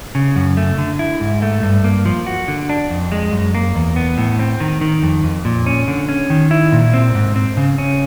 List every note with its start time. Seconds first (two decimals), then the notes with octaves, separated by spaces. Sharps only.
0.15 C#3
0.36 F#2
0.57 A3
0.78 D3
0.99 E4
1.20 G#2
1.42 A3
1.63 G2
1.84 A#3
2.05 F3
2.26 F#4
2.48 D3
2.69 D4
2.90 F2
3.12 G#3
3.33 F#2
3.55 A#3
3.76 E2
3.96 B3
4.18 A2
4.39 C4
4.60 D#3
4.81 D#3
5.03 F2
5.24 F2
5.45 A#2
5.66 C#4
5.88 D3
6.09 C#4
6.30 D#3
6.51 E4
6.72 A#2
6.94 C4
7.15 G#2
7.36 C4
7.57 C#3
7.78 C#4